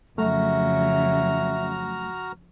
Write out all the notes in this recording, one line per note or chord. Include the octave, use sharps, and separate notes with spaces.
F2 C#3 F#3 A3 F#4 E5 A#5 F6